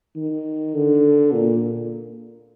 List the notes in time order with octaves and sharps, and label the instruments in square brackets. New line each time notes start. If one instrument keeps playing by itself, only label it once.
[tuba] D#3
D3
A#2